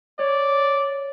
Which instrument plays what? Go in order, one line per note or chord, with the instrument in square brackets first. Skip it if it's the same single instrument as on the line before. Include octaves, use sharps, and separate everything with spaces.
[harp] C#5 [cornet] D5